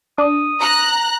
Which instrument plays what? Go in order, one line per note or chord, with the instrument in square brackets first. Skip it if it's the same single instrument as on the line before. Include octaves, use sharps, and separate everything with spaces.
[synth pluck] D4 [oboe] D#6
[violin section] A#5 F#6